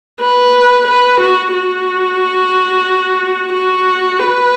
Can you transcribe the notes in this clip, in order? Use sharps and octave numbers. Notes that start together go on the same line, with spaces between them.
B4
B4
F#4
F#4
F#4
B4